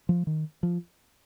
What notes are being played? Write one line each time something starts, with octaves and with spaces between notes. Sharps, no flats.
F3
D#3
F3